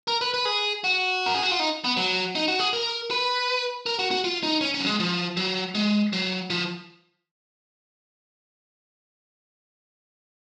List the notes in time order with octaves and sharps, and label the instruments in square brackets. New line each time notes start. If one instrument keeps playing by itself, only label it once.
[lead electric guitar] A#4
B4
B4
G#4
F#4
A#4
G#4
F#4
F4
D#4
B3
F#3
D#4
F#4
G#4
A#4
B4
A#4
F#4
F#4
F4
D#4
C#4
C#4
F#3
G#3
F3
F#3
G#3
F#3
F3